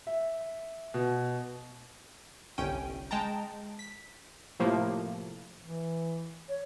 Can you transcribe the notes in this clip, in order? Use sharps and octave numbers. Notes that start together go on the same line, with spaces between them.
E5
B2
G1 C2 C#4 G5 D#7
G#3 G5 A5 A#5
B6
A2 C3 F3 A3 A#3
E3
C#5